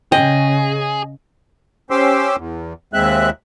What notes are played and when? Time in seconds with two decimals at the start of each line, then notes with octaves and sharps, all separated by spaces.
0.12 C#3 G#4 D#5 G5
1.91 C#4 G4 C5 C6 D6 E6
2.37 E2
2.93 D#2 G#3 C4 E5 F#6